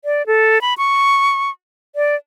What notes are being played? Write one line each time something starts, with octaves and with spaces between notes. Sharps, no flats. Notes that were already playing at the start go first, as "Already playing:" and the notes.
D5
A4
B5
C#6
D5